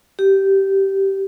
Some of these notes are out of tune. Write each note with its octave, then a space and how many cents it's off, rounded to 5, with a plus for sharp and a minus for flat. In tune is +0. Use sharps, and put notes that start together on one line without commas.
G4 -15